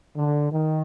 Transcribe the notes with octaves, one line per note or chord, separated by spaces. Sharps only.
D3
D#3